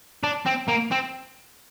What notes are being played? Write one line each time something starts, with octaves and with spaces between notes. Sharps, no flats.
D4
C4
A#3
C4